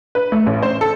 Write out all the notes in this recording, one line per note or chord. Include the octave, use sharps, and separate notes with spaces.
B4
A3
A1
C5
A4